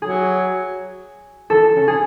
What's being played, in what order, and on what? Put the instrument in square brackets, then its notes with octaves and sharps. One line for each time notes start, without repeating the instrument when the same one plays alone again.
[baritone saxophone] F#3 [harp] G#4
[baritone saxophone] E3 [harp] A4
[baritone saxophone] C#3
[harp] G#4